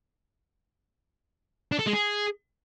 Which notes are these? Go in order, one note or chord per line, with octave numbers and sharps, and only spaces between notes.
D4
A4
G#3
G#4